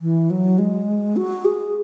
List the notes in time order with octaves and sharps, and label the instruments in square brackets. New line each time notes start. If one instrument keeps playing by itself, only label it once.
[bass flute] E3
F#3
G#3
F#4
G#4